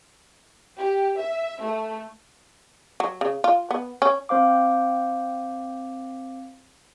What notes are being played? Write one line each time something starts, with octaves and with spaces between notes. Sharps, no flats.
G4
E5
A3
F#3
C#3
F4
B3
C#4
C4 C5 F5 D6